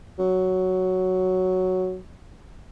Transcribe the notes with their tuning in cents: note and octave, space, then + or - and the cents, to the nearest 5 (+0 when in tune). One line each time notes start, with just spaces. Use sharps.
F#3 +5